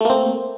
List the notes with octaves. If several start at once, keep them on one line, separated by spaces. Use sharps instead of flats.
A3 A#3 C4